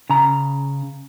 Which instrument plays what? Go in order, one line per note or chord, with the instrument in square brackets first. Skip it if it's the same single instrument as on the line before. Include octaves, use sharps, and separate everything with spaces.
[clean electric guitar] C#3 A#5